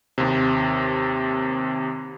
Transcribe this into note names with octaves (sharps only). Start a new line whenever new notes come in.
D#2 C3